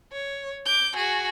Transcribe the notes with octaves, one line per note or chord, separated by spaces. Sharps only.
C#5
D6 G6
F#4 G#4